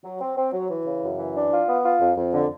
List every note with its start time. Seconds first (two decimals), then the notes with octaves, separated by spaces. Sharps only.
0.04 F#3
0.20 C4
0.37 C4
0.53 F#3
0.69 E3
0.86 C#3
1.02 F#2
1.19 E3
1.35 D4
1.52 F4
1.68 B3
1.85 F4
2.01 F2
2.17 F2
2.33 D3